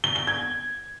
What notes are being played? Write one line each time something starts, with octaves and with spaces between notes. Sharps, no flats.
G7
G7
G#6